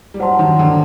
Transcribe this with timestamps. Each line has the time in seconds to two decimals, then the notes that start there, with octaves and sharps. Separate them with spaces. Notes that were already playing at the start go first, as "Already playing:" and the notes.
0.14 G3
0.19 F#3 C5 F#5 A5 C6
0.39 D#3
0.59 D3